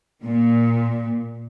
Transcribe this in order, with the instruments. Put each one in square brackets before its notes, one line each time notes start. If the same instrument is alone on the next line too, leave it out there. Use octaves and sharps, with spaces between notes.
[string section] A#2